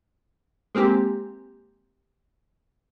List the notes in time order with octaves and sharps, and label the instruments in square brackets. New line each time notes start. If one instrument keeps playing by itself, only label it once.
[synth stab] G#3 A#3 C4 G4